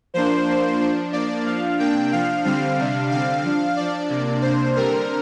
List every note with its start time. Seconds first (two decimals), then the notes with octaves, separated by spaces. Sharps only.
0.14 F3 A#3 D4 C5
0.46 F3 A#3 D4
0.80 F3 D4
1.12 F3 A#3 D4 D5
1.46 F3 D4 F5
1.79 C3 A#3 D4 G5
2.11 F3 D4 F5
2.45 D3 G3 C4 F5
2.78 C3 G3 D4
3.10 D3 G3 C4 F5
3.43 F3 D4
3.76 F3 D4 D5
4.09 C3 A#3 D4
4.42 C3 A#3 D4 C5
4.76 D3 G3 C4 A#4